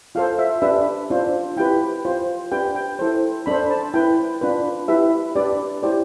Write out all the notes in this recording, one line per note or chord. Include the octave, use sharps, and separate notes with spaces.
F4 A4 C5 F5
E5
D4 G4 B4 E5
D4 F4 C5
E4 G4 B4 G5
F4 C5
D4 G4 B4 G5
G5
E4 A4 C5
D4 A4 C5 B5
A5
E4 B4 G5
D4 F4 B4
E4 G4 B4 E5
D4 G4 B4 D5
D5
E4 G4 C5 D5